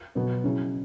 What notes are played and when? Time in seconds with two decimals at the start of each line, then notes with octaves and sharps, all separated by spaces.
0.15 B2 F#3 B3 F#4
0.44 C#3 F#3 C#4 E4